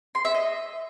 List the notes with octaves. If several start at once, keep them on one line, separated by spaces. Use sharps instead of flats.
C6
E5
D#5